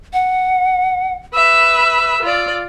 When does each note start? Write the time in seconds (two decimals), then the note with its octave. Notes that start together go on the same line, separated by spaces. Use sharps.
0.13 F#5
1.33 B4 E5 E6
2.22 F4 D5